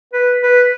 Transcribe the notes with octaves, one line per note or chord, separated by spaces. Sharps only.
B4
B4